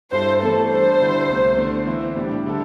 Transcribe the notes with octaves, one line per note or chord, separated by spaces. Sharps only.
G2 G3 E4 A4 C5
E3 A3 C4 A4
G3 D4 A4 C5
D3 G3 E4
C2 C3 A3
D3 A3 C4
E3 C4 E4 C5
A2 G3 D4 G4
D3 G3 E4 A4